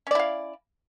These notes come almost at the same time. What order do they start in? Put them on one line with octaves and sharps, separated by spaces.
C#4 D5 E4 F5